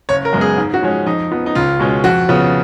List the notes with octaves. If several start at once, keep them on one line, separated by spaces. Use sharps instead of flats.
F#1 C#5
A#4
F#2 C#3 G#3 B3
G#4
G#2
F#4
F3 G#3 C#4
F2 D#4
F3 B3
D#4
C#2 F4
B2 G#3 C#4
F2 F#4
C#3 F3 B3